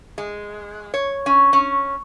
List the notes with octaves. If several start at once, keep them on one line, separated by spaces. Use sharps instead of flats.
G#3
C#5
C#4
C#4